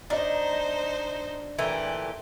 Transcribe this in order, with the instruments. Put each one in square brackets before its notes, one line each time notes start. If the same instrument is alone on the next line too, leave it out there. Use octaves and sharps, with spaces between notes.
[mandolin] D4 [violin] D#4 C5 [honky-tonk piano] D#5 A#5
[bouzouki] A#2 E3 A3 [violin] G4